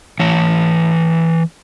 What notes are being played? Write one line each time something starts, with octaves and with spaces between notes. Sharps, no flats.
E3 C#5